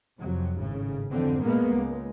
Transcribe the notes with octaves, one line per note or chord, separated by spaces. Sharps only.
F2 C3 F#3
G#1 A2 C#3
F2 D3 E3 C4
A#2 G#3 A#3 B3
C#2 G#3